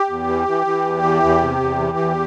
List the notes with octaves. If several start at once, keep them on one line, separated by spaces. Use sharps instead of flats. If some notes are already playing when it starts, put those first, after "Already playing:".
Already playing: G4
E2
E3
E3
E3
E2
E3
E2
C3
E2
E3
E2